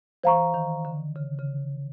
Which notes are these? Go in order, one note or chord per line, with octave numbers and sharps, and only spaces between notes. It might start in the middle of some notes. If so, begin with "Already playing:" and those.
E3 C5 F5 A#5 C#6
D#3
D3
C#3
C#3